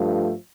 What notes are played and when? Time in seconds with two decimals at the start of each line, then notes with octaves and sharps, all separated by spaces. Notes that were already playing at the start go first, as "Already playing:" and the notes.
Already playing: G2 F3 A3